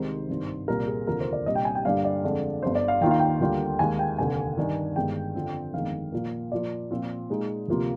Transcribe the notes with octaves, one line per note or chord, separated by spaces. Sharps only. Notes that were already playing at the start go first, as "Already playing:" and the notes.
Already playing: C2 C3 D#3 G#3 D#4 C5
G#1 G2 D#3
C2 A#2 G3 A#4
G#4
F1 D#2 D3 F3 A#4
C5
D5
C2 A#2 G3 D4 D#5
G5
G#5
G5
G2 D3 G3 A#3 D4 F5
D5
F2 D3 G#3 D4
G1 G2 D3 C5
D5
F5
D#2 D#3 A#3 F4 G5
F5
G5
D2 D3 G3 A#3 F4
D#2 D#3 G#3 D#4 G#5
G5
F1 D#2 D3 G#5
G2 D#3 G3 D4
G1 G2 D#3 G#3 G5
F2 D3 F3 C4
G1 F2 D#3 G#3 F5
A#2 F3 A#3
A#2 F3 A#3 D5
A#2 F3 C4 F4
A#2 G#3 D#4
D2 C3 F3 A#3 F4